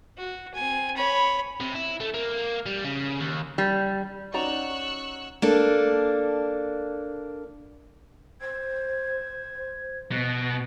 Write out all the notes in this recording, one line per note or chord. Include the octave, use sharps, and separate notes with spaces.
F#4
C4 G#5
C#5 B5
C3
E4
A3
A#3
G3
C#3
D#2
G3
C#4 D#4 F#4 D5 A#5 C#6 E6 F#6
A#3 D4 A4
C5 G#6
B2 F#6